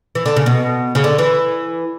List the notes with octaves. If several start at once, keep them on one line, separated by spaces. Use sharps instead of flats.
E3
D3
C#3
B2
C#3
D3
E3